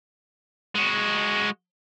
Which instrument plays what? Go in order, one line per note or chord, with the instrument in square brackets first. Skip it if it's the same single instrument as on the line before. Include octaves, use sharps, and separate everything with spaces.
[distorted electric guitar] G#3 F#4